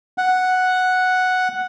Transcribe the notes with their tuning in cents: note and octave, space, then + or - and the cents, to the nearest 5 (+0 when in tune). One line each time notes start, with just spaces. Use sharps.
F#5 +0